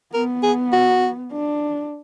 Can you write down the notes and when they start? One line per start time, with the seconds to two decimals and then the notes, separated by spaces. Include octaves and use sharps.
0.14 B3 A#4
0.43 G#4
0.73 F#4
1.32 D4